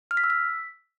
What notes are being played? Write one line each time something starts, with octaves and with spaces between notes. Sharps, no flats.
F6
B6
E6
B6